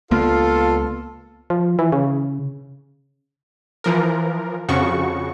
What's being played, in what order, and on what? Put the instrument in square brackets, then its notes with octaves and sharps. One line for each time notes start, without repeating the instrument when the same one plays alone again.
[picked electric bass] C#2 A#3 B3 [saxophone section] D4 F4 [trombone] A4
[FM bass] F3
E3
C#3
[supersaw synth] E3 F3 A#4
F2 C#3 F3 F#4 C#6